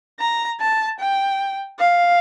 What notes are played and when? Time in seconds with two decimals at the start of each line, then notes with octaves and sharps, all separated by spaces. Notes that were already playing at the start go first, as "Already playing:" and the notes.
0.20 A#5
0.60 A5
1.00 G5
1.79 F5